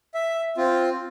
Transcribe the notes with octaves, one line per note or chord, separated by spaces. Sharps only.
E5
C4 F4